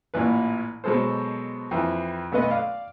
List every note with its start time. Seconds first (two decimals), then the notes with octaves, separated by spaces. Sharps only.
0.14 A1 A#2 E3 B4
0.84 B2 F#3 G#3 A4 C5
1.71 F2 E3 E4
2.32 B1 A3 B3 B4 D#5
2.49 D5 F5